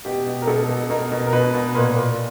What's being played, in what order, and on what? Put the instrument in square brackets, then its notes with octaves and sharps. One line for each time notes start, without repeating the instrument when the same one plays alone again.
[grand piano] B2 G4
B2
A#4
B2 A4
B2
B2 A#4
B2
A#4
B2 B4
B2
A#2 B4
A#2